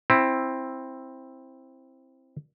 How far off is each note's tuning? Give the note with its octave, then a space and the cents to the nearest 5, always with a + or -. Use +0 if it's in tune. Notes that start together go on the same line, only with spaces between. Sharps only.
C4 +10 E4 +0